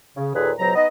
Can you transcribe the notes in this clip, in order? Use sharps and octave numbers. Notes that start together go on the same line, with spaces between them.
C#3
D#2 A#2 G#4 A4 B4
C#2 B2 F#3 C5 A#5
B3 D#4 B4 D#5